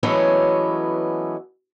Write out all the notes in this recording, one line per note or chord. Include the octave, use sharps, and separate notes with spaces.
E3 F#3 G#3 A3 B3 C#4